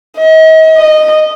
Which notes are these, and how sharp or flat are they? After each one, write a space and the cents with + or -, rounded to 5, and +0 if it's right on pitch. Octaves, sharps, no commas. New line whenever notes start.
D#5 +40
D#5 -10